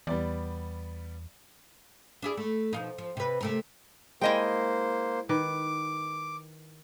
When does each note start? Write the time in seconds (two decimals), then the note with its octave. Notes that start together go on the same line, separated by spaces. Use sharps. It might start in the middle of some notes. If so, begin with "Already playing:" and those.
0.07 E2 G3 B3 D5
2.22 D4 E4 G#4
2.37 A3
2.73 B2 F3 D#4
2.98 F3
3.17 C3 B4
3.41 C3 A3 A#4
4.21 G#3 A#3 E4 C5 D#5 G5
5.29 D#3 B4 D6